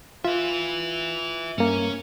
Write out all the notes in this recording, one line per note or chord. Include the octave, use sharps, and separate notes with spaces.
F4 B4 E5
G2 A#3 C#4